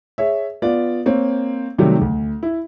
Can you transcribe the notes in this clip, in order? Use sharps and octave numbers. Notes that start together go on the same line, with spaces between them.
G#4 C#5 E5
B3 F4 D5
A#3 C4 C#5
C3 D#3 F#3 G3 A3
D2
E4